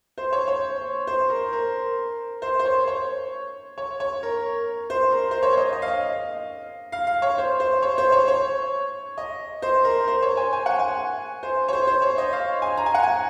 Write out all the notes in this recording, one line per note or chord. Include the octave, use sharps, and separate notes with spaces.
C5
C#5
C#5
C5
A#4
A#4
C5
C5
C#5
C#5
C#5
C#5
A#4
C5
A#4
C5
C#5
C#5
D#5
D#5
F5
D#5
F5
F5
C#5
C5
C5
C#5
C5
C#5
C#5
D#5
C5
A#4
C5
C#5
G#5
G#5
F#5
G#5
C5
C#5
C5
C5
C#5
D#5
F5
G#5
A#5
G#5
F#5
G#5